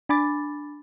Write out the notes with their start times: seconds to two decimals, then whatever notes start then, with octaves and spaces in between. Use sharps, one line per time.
0.09 D4 G#5 B5 D6 A6